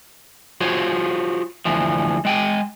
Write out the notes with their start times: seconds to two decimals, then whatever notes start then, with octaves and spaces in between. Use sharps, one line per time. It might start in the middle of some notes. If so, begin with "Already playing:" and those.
0.61 F4 F#4 G#4 C5 C#5
1.65 D2 E3 F3
2.25 G#3 G5 G#5